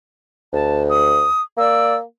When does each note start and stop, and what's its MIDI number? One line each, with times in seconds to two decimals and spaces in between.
0.53 1.27 38
0.53 0.83 81
0.90 1.42 87
1.58 2.03 58
1.58 1.94 74
1.58 1.94 88